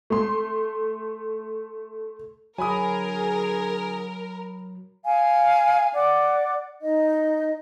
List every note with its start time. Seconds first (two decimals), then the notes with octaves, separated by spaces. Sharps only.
0.10 A3 C6
2.58 D3 F#3 F#4 G#4 A#4 G#5 B5 D#6
5.04 F5 G#5
5.94 D5 F#5 D6
6.81 D#4 D#5